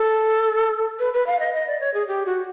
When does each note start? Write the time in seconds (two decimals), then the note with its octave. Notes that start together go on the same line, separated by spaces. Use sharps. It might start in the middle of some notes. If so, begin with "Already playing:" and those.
Already playing: A4
0.99 B4
1.13 B4
1.27 F5
1.39 D#5
1.54 D#5
1.67 D5
1.80 C#5
1.94 G#4
2.07 G4
2.26 F#4